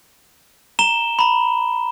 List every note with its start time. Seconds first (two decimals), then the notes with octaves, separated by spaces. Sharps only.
0.79 A#5 E7 G7
1.19 A#5 B5